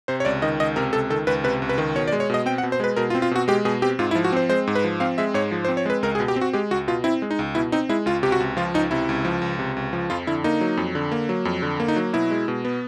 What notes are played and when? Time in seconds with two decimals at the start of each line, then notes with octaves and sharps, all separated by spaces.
0.08 C3 C5
0.20 C#5
0.25 C#2 D5
0.42 D#3 D#5
0.60 C#2 D#5
0.76 C3 A#4
0.93 C#2 A4
1.10 D#3 A4
1.27 C#2 B4
1.44 C3 B4
1.62 C#2
1.69 B4
1.78 D#3
1.96 B2 C#5
2.08 D5
2.12 G#3
2.20 C#5
2.30 B2 D#5
2.46 C4 G5
2.58 F#5
2.63 B2
2.72 C5
2.80 G#3 B4
2.96 B2 A#4
3.10 F4
3.15 C4
3.22 F4
3.31 B2 F#4
3.48 G#3 G4
3.65 B2 G#4
3.82 C4 G4
3.99 G#2 F4
4.11 E4
4.15 F3
4.24 F#4
4.32 C4 C5
4.49 G#3 C5
4.67 G#2
4.75 B4
4.84 F3
5.00 C4 F5
5.18 G#3 E5
5.34 G#2 C#5
5.52 F3
5.65 C5
5.69 C4
5.77 C#5
5.86 G#3 B4
6.03 C#2 A#4
6.15 G#4
6.20 B2
6.28 G4
6.36 C4
6.41 F#4
6.53 G#3 G4
6.71 C#2 F#4
6.88 B2 F4
7.04 C4 E4
7.22 G#3
7.31 D#4
7.39 C#2
7.55 B2 E4
7.72 C4 D#4
7.89 G#3 E4
8.06 C#2 F4
8.23 C3 G4
8.32 F#4
8.40 C#2
8.57 F3 F4
8.74 C#2 D#4
8.91 C3 E4
9.09 C#2
9.25 F3
9.42 C#2
9.59 C3
9.77 C#2
9.93 F3
10.10 F2 F4
10.27 D3 E4
10.44 A#3 D#4
10.61 F#3
10.77 F2
10.95 D3
11.12 A#3
11.29 F#3
11.45 F2
11.62 D3
11.80 A#3
11.88 D#4
11.96 F#3
12.13 B2 E4
12.31 G#3
12.48 B2
12.65 B3